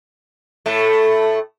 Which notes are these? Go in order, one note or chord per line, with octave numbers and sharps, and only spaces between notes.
A2 A3